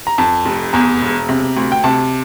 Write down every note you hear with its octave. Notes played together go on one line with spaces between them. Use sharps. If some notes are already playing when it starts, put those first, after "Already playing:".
A#5
F2 A5
F1
E2 A#5
E1
C3
D2
G5
C3 A5